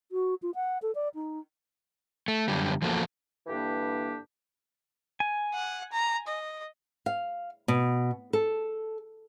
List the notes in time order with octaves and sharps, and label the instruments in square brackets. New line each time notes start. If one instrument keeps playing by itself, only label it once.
[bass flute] F#4
F4
F#5
A4
D5
D#4
[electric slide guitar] A3
F#2 D3 G3
E2 F3 A#3 F#4 A4
[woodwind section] G2 D3 E3 A#3 D4 G4
[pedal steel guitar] G#5
[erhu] F#5
A#5
D#5
[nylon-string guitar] F5
B2
A4